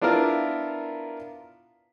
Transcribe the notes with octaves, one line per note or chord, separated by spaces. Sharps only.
B3 D4 E4 F4 A#4